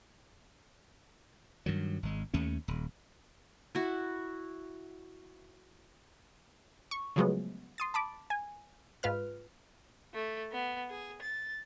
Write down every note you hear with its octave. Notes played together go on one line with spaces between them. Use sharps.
G2 D#3 F#3
G#1 G#3
D#2 A3 C#4
D#1
E4 F#4
C#6
C#3 F3 F#3 G#3 A3 B3
C6 D#6 A6
A5 B5 D6
G#5
G#2 F4 B4 F6
A3
B3
G#4
A6